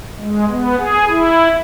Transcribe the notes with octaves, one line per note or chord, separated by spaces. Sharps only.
G#3
B3
G#4
E4